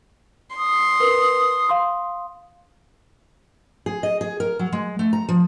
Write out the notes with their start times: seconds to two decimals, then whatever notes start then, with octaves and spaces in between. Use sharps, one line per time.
0.56 C6 D#6
1.00 A#4 B4
1.68 F5 C6 D#6
3.86 G#4
4.03 D#5
4.21 G#4
4.40 A#4
4.59 F#3
4.72 G#3
4.99 A3
5.13 A#5
5.29 F3